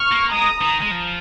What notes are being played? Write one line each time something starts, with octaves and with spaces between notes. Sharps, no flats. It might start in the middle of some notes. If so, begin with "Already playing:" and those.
Already playing: C#6 F6
A#3
G#3 A#5 D#6
D#3 A#5 D#6
G#3
F3